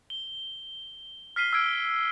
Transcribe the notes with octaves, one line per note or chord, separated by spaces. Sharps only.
G7
F6 B6 C7 D#7 G7
E6 F6 G#6 D7